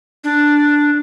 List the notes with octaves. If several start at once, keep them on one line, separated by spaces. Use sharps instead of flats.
D4